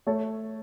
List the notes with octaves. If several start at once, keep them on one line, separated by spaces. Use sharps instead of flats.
A3 A4 C#5